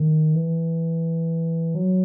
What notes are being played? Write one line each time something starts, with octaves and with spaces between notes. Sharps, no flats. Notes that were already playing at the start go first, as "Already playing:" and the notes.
Already playing: D#3
E3
F#3